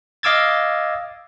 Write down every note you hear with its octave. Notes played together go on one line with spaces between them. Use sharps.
D#5 F5 D6 E6 G#6 A6